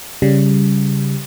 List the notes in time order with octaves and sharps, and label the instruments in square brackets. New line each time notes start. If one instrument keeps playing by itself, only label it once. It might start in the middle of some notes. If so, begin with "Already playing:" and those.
[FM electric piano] C#3 G3